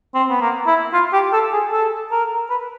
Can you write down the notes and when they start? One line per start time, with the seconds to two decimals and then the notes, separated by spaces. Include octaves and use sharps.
0.15 C4
0.30 B3
0.41 A#3
0.67 E4
0.93 F4
1.13 G4
1.33 A4
1.53 G#4
1.72 A4
2.11 A#4
2.50 B4